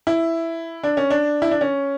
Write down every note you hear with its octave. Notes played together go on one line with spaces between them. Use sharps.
E4
D4
C#4
D4
E4
D4
C#4